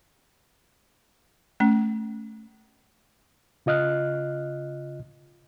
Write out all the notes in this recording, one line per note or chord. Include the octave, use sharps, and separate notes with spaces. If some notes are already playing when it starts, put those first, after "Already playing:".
A3 C#4
C#3 F4 D#5 F6 F#6